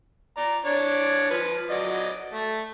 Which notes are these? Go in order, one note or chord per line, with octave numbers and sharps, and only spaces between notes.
D5 A#5
D4 C#5 D5
F3 B4
F#3 D5 D#5
A3